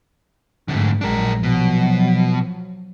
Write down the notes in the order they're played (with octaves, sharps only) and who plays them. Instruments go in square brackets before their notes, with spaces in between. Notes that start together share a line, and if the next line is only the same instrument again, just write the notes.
[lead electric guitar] F2 D3 [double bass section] G#2 A3
[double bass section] A#1 F#3 G#3 [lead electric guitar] D4 A#4
[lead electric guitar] B2 [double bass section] F3 F#3